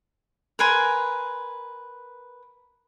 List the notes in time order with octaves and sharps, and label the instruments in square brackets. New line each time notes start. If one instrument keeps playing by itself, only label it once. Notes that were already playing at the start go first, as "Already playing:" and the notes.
[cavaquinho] A#4 B4 G#5 C6